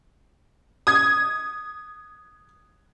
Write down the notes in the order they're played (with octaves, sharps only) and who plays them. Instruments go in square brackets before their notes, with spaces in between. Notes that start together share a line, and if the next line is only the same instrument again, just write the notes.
[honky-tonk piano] D#6 G#6